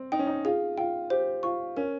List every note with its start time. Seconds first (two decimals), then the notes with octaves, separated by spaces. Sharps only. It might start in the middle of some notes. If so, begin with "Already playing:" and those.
Already playing: C4
0.12 D#4 G5
0.19 C#4
0.27 D#4
0.45 F4 G#4
0.78 F4 G5
1.10 G4 C5
1.43 F4 C#6
1.77 C#4 A#4